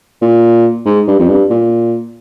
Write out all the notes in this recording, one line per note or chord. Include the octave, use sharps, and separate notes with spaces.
A#2
G#2
G2
F2
G2
A#2